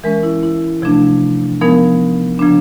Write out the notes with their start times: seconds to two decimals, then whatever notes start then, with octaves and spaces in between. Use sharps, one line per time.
0.04 E3 G#3 C#4 A#4
0.23 E4
0.43 E4
0.82 C3 F3 A3 D4
1.61 F3 G#3 B3 D#4 A#4
2.39 C#3 F3 A#3 D4